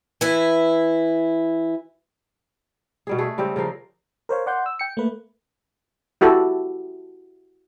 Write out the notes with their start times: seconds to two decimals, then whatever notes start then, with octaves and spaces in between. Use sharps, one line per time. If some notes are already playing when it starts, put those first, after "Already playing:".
0.21 E3 E4
3.07 B2 G3 G#4
3.18 A3 G#4 B4
3.38 C#3 G3 C4 G4
3.56 C#3 F3 A#4 F5
4.29 A#4 C5 C#5 F5
4.46 D5 F#5 C6 G6
4.66 E6
4.79 G5 C#7
4.97 A3 A#3 B4
6.21 E4 F#4 G4 A4